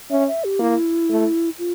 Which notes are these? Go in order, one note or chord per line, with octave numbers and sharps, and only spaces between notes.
C#4 E5
E5
G4
A#3 E4
A3
F4